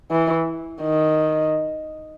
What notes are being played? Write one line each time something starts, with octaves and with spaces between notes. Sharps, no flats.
E3
D#3